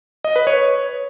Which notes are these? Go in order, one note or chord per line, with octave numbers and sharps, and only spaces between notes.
D#5
B4
C#5